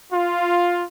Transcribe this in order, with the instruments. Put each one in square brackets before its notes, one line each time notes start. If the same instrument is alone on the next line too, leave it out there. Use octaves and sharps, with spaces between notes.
[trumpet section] F4